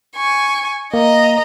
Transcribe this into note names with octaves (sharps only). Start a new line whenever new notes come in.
G#5 C#6
A#3 D#5 A#5